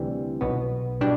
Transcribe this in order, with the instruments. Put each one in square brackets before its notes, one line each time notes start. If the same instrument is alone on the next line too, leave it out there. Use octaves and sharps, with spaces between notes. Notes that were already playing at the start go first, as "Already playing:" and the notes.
Already playing: [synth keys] D2 C3 E3 G3
B1 B2 B3
B2 G3 D4